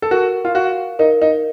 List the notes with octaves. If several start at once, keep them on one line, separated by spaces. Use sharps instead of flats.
A4
F#4 A#4
F4
F#4 F5
D#4 A#4
D#4